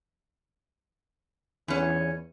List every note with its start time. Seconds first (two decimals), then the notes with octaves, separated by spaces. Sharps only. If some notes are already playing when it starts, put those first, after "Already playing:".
1.68 E2 E3 C#4